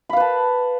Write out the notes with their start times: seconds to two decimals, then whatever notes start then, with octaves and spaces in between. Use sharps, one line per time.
0.09 B5
0.13 F5
0.17 B4
0.20 A5